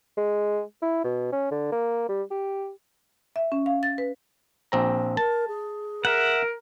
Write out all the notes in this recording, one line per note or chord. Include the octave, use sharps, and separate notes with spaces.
G#3
E4
B2
C#4
D3
A#3
G3
G4
E5
C#4
F5
A6
B4
A#1 C4 A#5
A#4 A5
G#4
A#4 E5 F#5